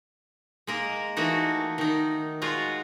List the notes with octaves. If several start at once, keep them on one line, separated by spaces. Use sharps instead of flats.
G#3 A#3 A#4
E3 A3 A#3 D#4 F#4
D#3 D#4
G#3 F4 F#4 C#5